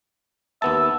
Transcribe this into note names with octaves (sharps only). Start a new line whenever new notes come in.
D#2 B3 E5 A5